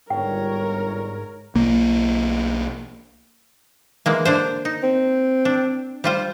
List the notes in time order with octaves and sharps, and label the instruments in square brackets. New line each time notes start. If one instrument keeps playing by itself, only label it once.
[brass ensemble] G1 G3 C#5 [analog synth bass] G#2 [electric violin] A#4 [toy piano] G5
[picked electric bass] B1 A#3
[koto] E3 G#3 A#3
D3 D4 C5
D#4
[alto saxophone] C4
[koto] D4
G3 F4 C5